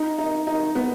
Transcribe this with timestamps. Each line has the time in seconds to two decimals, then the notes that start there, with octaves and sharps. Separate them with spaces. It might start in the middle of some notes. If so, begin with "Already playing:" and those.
Already playing: D#4
0.18 D#4
0.47 D#4
0.75 B3